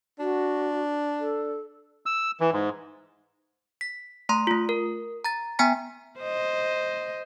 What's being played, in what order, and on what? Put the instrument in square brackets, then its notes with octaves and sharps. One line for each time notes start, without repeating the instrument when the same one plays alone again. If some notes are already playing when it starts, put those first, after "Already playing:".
[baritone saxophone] D4 [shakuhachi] F#4
[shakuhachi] A4
[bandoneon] E6
E3
G#2
[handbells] B6
A3 A#5 C6
A3 F4
A#4
A#5 A6
B3 G5 G#5 A#5 B6
[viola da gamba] C5 D#5